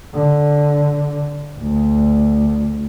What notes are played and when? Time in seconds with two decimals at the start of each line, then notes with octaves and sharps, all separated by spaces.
0.14 D3
1.58 D2